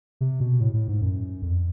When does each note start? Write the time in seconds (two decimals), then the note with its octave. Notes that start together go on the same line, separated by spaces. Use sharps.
0.21 C3
0.40 B2
0.61 A2
0.74 A2
0.88 G#2
1.01 F#2
1.42 F2